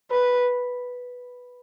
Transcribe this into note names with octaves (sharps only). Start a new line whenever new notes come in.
B4